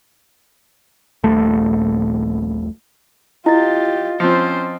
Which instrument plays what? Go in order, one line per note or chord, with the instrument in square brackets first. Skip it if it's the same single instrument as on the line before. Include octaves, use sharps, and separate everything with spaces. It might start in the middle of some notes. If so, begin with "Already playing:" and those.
[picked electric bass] D#1 A#1 A3
[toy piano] E4 [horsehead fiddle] F4 G4 [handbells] D#5 A6
[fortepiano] F3 C4 [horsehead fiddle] C#4 C5